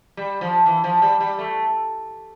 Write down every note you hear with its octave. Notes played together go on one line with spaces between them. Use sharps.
G3
F3
E3
F3
G3
G3
A3